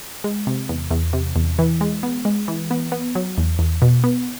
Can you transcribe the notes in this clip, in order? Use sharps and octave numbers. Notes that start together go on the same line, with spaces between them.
G#3
C3
E2
E2
C3
E2
E3
G#3
B3
G#3
E3
B3
B3
F#3
E2
E2
B2
B3